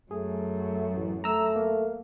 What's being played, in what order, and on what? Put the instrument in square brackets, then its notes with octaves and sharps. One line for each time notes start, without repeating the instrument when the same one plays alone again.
[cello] F#2 [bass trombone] A3 [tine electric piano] G#4
[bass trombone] A1
[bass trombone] A3 [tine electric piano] A#5 E6
[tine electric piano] A#3